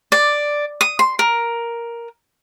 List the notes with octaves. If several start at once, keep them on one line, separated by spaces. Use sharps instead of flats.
D5
D#6
C6
A#4